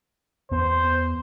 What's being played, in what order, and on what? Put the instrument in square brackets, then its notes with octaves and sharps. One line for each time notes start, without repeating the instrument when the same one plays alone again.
[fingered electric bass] E2 B3 [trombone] C5